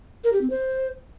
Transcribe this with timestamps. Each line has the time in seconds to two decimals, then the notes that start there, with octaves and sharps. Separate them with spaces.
0.24 A#4
0.33 G4
0.41 C4
0.50 C5